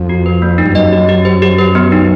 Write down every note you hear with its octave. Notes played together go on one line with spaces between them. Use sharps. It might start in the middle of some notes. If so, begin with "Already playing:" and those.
Already playing: F2
F#4
B4
A#3
D#4
G2
F#2 D#5
G4
G4
C5
G4
B4
B3
D#4